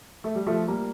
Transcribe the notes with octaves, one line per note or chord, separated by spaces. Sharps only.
A3
G3
F3 A3
G3 A#3